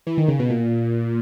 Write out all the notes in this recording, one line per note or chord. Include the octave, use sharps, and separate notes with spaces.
E3
D#3
C#3
B2
A#2